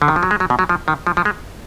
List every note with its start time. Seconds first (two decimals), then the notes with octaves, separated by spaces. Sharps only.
0.02 D3
0.08 D#3
0.16 F3
0.23 F#3
0.31 G#3
0.40 F#3
0.50 B2
0.59 F#3
0.69 F3
0.88 D#3
1.07 F3
1.17 F3
1.25 G#3